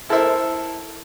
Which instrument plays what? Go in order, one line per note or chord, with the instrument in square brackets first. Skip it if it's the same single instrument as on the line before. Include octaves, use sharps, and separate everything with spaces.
[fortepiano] E4 A4 A#4 C5 E5